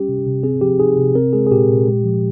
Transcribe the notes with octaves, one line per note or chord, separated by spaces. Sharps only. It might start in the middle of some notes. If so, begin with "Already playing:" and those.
Already playing: G3 C#4 G4
C3
C3
C4 G#4
F3 G4
D#4 G#4
C3
C4 A#4
G#3 G#4
G#4
A#2 G4
A#2
G#3
F3